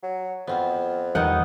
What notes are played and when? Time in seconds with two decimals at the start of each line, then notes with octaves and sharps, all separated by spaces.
0.03 F#3
0.47 F2 B3 C4 F4
1.15 E2 A#2 D#3 G3 B3 D#4 D#5 F#5